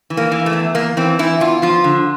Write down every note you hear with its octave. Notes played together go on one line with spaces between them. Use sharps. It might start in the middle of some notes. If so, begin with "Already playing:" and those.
E3
A#3
E3
A3
E2
E2 A#3
E3 C4
E3 E4
E2 F4
F3 F4
D3